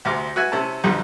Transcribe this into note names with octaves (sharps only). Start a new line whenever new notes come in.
D2 C3 C4 D6 F6
F#4 B4 E5 G#5
C3 C#4 E4 A5
B1 F2 D3 G3